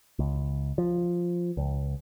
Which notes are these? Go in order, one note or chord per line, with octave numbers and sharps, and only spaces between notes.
C#2
F3
C#2